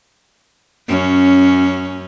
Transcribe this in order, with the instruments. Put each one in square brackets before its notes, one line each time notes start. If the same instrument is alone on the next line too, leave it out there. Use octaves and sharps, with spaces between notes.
[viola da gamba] F#2 C#4